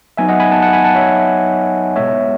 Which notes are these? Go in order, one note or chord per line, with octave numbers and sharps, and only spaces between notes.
F#3 B3 D#4 E5 G#5
D#5 F#5
G#5 B5
F#5 A5
F#5 A5
G#5 B5
F#5 A5
C#5 E5
B2 G#3 B3 C#5 E5